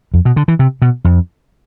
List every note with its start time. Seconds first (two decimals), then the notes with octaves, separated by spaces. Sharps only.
0.14 F2
0.25 B2
0.36 D3
0.48 E3
0.59 C3
0.82 B2
1.04 F2